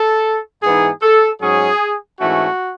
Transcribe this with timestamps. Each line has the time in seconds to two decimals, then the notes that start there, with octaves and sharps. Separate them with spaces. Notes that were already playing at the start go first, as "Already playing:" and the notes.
Already playing: A4
0.63 G#2 E3 B3 D#4 G#4
1.02 A4
1.41 G#2 F#3 C#4 G#4
2.20 G#2 E3 A3 C#4 F#4